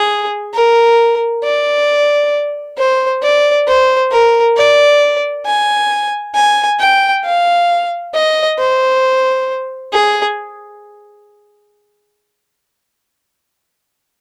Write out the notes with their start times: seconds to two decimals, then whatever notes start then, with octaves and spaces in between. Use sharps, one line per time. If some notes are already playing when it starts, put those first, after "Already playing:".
Already playing: G#4
0.54 A#4
1.44 D5
2.78 C5
3.23 D5
3.67 C5
4.11 A#4
4.56 D5
5.46 G#5
6.35 G#5
6.80 G5
7.25 F5
8.14 D#5
8.59 C5
9.93 G#4